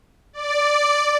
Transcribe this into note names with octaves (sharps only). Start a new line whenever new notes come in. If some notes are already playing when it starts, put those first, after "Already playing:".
D5